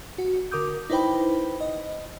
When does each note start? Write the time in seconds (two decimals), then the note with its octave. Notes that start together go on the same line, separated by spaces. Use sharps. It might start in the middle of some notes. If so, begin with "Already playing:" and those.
0.18 F#4
0.51 D3 A#4 D6 D#6 G6
0.90 D#4 E4 B4 C5 G5 B5
1.60 D#5